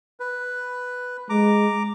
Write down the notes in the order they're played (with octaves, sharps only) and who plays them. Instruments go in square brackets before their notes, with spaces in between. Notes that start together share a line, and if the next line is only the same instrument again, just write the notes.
[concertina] B4
[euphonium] G#3 [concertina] A#5 D6